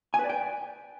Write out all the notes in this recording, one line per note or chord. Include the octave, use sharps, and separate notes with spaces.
G#5
B4
D5
G5